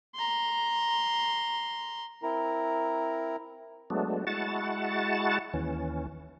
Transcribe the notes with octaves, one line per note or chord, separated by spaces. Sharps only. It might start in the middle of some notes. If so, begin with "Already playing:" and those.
A#5 C6
C4 E4 A#4 A#5
F#3 G#3 A3 B3 D4
G#3 E4 F#4 F#5 A5 A6
D#2 E3 C#4